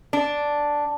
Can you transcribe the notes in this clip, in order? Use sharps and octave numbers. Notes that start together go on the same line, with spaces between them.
D4